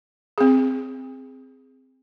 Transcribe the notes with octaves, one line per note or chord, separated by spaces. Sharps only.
C4 G#4